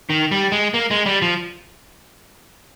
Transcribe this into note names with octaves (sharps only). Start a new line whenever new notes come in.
D#3
G3
G#3
A#3
G#3
G3
F3